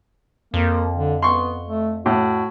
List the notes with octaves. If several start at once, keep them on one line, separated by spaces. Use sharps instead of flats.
F2 A#3
D3
B3 C6 C#6
A3
A2 F#4